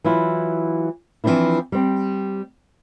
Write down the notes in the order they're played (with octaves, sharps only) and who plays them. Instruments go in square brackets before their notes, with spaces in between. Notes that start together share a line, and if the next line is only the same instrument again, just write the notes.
[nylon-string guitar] E3 F#3 E4 F4
E3 F3 A3 C4 D4 E4
G3 C4